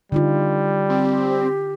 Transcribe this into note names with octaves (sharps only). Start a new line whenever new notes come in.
D3 G3 D#4 F4
C4 G4